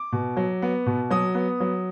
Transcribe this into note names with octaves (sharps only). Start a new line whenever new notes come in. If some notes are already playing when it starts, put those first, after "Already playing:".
Already playing: D6
B2
F#3
B3
B2
F#3 D#6
B3
F#3